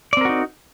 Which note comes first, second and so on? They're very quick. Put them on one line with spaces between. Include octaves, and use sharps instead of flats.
D5 C4 A#4 F#4 D#4